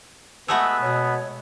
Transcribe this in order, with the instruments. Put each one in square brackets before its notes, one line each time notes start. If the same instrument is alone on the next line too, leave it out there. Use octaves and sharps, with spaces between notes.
[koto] G#3 A3 F#4 [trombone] B3 [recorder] E6
[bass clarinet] B2 [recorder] C#5